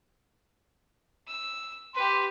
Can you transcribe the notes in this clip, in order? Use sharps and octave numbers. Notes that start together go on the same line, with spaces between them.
E6
G4 B4 C6